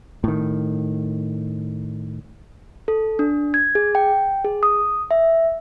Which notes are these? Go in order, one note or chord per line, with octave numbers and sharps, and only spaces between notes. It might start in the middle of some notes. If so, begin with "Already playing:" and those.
A2 D#3
A4
D4
G#6
G#4
G5
G#4
D#6
E5